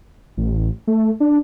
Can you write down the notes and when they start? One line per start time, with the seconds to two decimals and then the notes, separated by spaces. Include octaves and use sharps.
0.37 A1
0.87 A3
1.20 D4